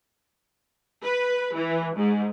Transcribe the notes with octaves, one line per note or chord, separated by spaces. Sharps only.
B4
E3
G#2